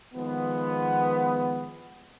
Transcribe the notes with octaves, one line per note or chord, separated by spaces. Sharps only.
D#3 F3 G#3 B3